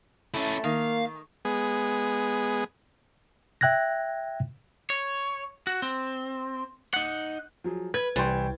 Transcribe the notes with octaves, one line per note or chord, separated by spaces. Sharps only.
A3 C#4 E4
D#3 A#3 F5
G#3 B3 G#4
E5 G5 F#6 G#6 A#6
C#5
F#4
C4
D#4 F#5
F3 F#3 G#4
B4 G#6
C2 E3 G3 G5 C6 C#6 A6